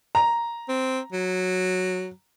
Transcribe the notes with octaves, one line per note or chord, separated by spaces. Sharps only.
A#5
C4
F#3